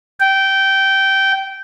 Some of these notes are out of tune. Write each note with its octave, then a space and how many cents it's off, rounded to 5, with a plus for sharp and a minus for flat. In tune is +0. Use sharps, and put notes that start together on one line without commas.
G5 -15